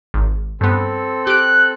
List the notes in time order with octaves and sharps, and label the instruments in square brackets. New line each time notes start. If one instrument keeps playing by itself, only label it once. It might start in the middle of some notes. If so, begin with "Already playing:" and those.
[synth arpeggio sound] G#1
[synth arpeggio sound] G2 B3 [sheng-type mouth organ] C4 A4
[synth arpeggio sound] G4 D7 [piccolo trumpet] F#6